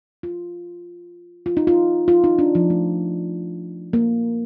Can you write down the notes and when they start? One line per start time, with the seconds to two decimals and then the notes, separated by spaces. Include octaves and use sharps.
0.23 F4
1.46 F4
1.57 D#4
1.67 F4
2.08 F4
2.24 D#4
2.39 D4
2.55 F3
2.70 A3
3.93 A#3